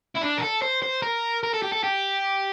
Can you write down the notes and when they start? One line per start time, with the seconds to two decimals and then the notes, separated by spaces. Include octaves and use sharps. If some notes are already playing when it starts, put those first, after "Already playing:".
0.15 E4
0.21 D4
0.38 A#4
0.42 A4
0.62 C5
0.82 C5
1.03 A#4
1.43 A#4
1.54 A4
1.63 G4
1.73 A4
1.84 G4